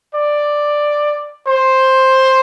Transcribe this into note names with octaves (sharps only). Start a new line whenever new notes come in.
D5
C5